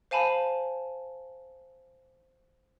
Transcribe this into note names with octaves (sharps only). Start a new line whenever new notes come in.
C5 F5 G#5 A5 B5